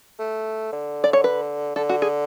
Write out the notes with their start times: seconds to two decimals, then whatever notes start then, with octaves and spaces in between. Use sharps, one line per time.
0.19 A3
0.72 D3
1.04 D5
1.13 C#5
1.24 B4
1.76 D3 A4
1.89 F#4
2.02 G#4